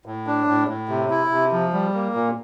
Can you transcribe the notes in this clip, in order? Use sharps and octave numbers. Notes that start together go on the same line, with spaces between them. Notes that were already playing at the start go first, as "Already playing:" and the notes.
A2
D4
A2
A2
C3
E4
C3
F3
G3
A#3
A#2